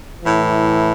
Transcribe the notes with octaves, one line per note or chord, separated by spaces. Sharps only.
A2 E3